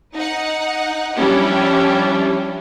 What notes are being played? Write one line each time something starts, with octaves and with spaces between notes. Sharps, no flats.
D#4 F#5
F3 G3 C#4 D4 E4 G4